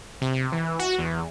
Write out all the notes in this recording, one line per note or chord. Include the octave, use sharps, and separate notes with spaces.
C3
E3
F#4
E2